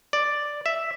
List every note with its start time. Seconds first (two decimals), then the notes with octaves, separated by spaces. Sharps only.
0.13 D5
0.66 E5